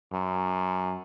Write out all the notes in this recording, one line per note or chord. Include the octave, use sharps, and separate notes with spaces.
F#2